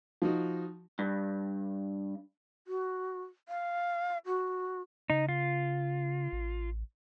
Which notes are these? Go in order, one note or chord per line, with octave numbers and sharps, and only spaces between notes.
F3 D#4 F#4
G2
F#4
F5
F#4
C#3 D#4
F4
A1